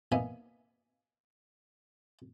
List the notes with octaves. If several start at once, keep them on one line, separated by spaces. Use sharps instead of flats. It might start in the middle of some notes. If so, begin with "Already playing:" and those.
A#3 B3 D#4 E5 G#5